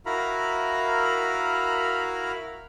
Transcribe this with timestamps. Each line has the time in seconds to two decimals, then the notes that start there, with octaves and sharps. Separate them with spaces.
0.06 E4 F#4 A#4 F5 A#5 B5